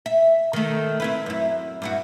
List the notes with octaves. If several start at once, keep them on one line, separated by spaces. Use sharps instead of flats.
E5
D#3 A3
C4 E4 B4
F#2 E4
G2 E4 F#4